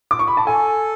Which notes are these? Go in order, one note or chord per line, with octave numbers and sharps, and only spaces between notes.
D6
C#6
B5
A5
A4 G#5